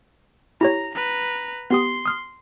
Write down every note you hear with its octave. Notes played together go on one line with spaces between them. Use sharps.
E4 G4 C#5 A#5
B4 A#5
B3 G4 C6 D#6
D#6 F6